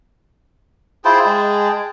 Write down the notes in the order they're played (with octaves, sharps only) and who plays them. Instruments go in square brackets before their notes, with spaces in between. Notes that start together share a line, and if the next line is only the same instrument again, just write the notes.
[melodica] E4 F4 C5 [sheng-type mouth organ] G#4 G5 A5
[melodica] G#3